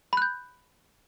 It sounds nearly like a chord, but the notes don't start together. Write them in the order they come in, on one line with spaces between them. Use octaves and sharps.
B5 F#6 G6